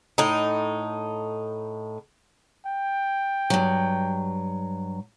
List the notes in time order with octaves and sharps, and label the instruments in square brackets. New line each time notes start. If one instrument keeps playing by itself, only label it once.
[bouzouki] A2 D#4
[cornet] G5
[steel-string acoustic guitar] G2 F#3